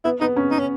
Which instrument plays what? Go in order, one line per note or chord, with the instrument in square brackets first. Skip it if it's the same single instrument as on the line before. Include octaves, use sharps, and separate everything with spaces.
[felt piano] B3 [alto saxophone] E4
[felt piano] B3 [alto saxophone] D#4
[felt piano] C#4
[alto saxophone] D#4
C#4